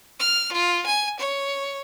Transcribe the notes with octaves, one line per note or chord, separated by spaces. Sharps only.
F6
F4
G#5
C#5